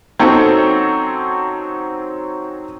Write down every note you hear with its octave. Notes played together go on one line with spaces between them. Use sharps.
F#3 C4 C#4 D#4 A4